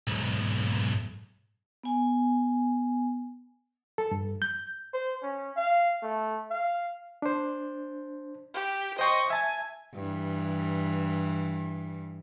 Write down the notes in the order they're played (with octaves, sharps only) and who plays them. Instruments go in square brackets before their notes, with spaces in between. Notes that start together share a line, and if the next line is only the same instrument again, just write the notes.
[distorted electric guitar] B1 G#2
[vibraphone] B3 G#5
[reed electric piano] A4
G2
G6
[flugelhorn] C5
C#4
F5
A3
F5
[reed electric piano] D4 C5
[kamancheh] G4
[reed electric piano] C5 G5 C6 [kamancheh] D#5 C#6
[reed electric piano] E5 A5 [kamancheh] G#5
[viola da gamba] G2 E3